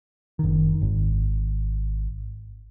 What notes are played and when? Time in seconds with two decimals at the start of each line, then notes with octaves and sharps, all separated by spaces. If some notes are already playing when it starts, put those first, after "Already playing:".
0.39 F#1 D#3
0.82 G#1